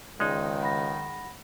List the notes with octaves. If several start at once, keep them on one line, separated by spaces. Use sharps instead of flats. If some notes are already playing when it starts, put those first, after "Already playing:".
C#2 D#3 G#3 D#4 D5
F#5 B5 A#6